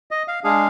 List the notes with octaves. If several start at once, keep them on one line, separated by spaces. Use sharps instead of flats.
D#5
F5
G#3 D4 G#4 F5